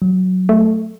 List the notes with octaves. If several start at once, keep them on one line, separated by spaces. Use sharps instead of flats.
F#3
A3